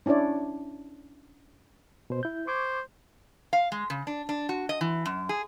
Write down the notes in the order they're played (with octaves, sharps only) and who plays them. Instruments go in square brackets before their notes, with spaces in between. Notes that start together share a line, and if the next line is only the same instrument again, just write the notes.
[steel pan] C#4 D4 E4 C#5 D5
[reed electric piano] B2 C5
E4 G6
[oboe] C5 [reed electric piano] C#6 D6 G#6
[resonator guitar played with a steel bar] F5
G#3
C#3
D4
D4
F#4
D#5
E3
F#2
G#4